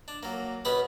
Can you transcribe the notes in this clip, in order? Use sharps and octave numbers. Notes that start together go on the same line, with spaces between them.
D4
F#3 A#3
B2 B3 C#4 G#4 B4 F#5